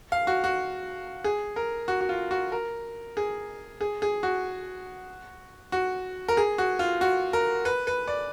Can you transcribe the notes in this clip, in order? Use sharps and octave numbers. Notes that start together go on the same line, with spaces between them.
F5
F#4
F#4
G#4
A#4
F#4
F#4
F4
F#4
A#4
G#4
G#4
G#4
F#4
F#4
A#4
G#4
F#4
F4
F#4
A#4
B4
B4
D5